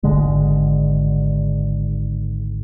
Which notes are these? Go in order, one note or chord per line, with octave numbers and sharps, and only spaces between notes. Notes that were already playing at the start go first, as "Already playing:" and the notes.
G#1 D3 G#3